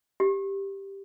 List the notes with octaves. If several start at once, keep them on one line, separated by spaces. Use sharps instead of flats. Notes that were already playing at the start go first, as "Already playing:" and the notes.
G4